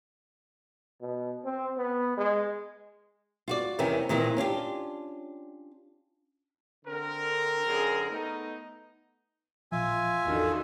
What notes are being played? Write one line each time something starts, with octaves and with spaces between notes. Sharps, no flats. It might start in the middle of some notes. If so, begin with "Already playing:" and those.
B2
C4
B3
G#3
F4 F#4 D5
E2 C3 D#3 A#3 B3 C#4
A#2 D#3 E3 A#3 C4
C#4 D4 F4 G4
D3 C4 A#4
F#2 D3 G#4
A3 B3 D#4
A1 A#2 F3 F4 E5 G#5
G#1 E2 D3 D#3 C#4 F#4